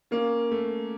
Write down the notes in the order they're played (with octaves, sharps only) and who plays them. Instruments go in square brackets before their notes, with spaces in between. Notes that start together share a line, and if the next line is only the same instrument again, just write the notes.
[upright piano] A#3 [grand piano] C#4
[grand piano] A3